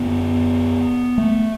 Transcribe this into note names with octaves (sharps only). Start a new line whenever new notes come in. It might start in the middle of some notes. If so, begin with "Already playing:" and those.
Already playing: F#2 D3 B3
A3